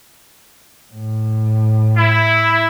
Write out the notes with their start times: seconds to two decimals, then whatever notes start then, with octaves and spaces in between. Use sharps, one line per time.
0.93 A2
1.96 E4